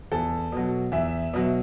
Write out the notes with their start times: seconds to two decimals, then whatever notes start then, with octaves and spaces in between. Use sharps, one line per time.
0.12 E2 A4
0.52 B2 F#3
0.92 E2 E5
1.33 B2 F#3